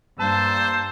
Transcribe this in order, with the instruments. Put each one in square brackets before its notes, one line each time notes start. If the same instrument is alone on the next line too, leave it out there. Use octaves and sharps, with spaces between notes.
[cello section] G2 [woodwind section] A#3 E6 [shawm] C5 [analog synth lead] A5